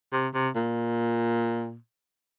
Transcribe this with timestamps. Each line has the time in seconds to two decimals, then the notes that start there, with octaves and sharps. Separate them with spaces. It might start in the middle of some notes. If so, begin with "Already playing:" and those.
0.12 C3
0.34 C3
0.55 A#2